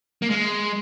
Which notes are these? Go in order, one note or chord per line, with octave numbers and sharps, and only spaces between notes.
A#3
G#3